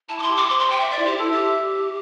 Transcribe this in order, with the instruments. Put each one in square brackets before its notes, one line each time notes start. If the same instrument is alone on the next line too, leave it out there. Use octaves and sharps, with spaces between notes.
[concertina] E4 [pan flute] A5
[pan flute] D6
[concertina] E4 [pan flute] C6
[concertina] G4
[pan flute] D6
[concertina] C5 [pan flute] C6
[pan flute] C6
G5
E5
[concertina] D5 [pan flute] E5
[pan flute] E4
[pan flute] G4 [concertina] C5
[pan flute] E4 [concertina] A4
[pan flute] G4 [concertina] E5